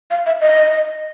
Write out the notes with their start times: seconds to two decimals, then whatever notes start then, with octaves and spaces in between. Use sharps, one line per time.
0.11 F5
0.26 E5
0.41 D#5